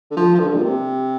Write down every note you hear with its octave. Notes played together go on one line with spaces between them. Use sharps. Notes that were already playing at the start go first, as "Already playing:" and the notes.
D3
F3
F3
D3
G2
A#2
C3